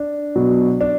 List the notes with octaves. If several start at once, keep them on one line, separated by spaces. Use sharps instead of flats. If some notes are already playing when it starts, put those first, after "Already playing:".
Already playing: D4
B2 F#3
D4